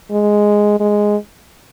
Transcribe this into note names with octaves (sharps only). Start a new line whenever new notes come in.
G#3
G#3